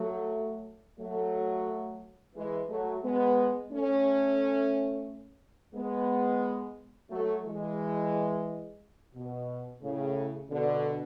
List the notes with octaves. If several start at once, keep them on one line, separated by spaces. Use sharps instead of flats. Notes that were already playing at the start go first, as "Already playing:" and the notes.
Already playing: F#3 A3
F#3 A3
E3 G#3
F#3 A3
G#3 B3
A3 C#4
G#3 B3
F#3 A3
E3 G#3
B2
A2 C#3
B2 D3